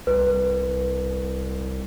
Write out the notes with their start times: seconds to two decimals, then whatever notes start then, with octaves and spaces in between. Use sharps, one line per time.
0.07 C2 B4